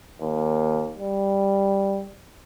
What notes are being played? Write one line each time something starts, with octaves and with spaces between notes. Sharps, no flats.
D#2
G3